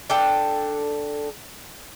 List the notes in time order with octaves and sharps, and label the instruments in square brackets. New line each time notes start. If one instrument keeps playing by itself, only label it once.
[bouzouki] D4 A4 G5